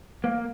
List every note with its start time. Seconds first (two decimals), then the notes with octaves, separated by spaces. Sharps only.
0.24 A#3